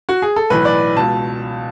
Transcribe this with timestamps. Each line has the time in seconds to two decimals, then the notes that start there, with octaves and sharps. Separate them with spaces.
0.09 F#4
0.22 G#4
0.36 A4
0.50 B1 A2 E3 B4
0.65 D5
0.96 C#2 B2 A5